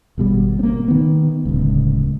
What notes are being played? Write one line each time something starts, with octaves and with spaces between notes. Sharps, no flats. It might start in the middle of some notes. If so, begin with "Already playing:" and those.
G#1 B2 G3
A#3 C4
D#3 B3
D1 C#2